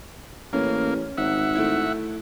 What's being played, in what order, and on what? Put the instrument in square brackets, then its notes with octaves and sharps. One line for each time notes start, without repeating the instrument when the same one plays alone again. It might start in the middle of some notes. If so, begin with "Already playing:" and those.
[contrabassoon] A1 [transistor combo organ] A#3 [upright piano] C#4
[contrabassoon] G#1 [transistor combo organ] E5 F#5
[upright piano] A3 E4